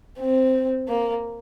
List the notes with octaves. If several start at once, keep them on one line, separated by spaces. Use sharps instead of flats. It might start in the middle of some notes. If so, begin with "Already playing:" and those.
C4
A#3